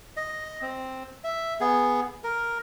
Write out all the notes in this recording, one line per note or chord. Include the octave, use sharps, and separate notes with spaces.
D#5
C4
E5
B3 G#4
A#4